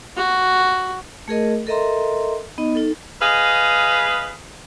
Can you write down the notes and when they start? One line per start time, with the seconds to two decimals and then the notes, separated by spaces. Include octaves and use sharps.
0.17 F#4
1.28 A3 G#4 A#4 D#5
1.67 A4 A#4 D#5 E5 A#5 C6
2.58 B3 D#4 D#5
2.75 D#4 A4
3.21 G#4 B4 D#5 F5